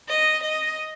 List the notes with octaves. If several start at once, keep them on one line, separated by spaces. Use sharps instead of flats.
D#5
D#5